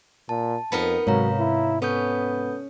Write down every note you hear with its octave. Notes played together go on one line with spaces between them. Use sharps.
A#2 A5
F2 B3 D#4 A#4
G#2 C3 F#3 C#5 F5 A#5
E4
B3 C#4 A4 D#6 G6